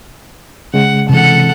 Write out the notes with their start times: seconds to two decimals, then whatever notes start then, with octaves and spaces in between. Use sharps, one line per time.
0.74 C#3 G#3 F#5
1.09 C3 E3 A4 F#5